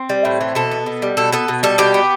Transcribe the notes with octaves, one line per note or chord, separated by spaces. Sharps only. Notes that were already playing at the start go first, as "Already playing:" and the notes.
Already playing: C4
G3
A2
E3
B2 A4
B3
B2
G3
B2 A4
B3 A4
B2
G3 A4
B2 G4
B3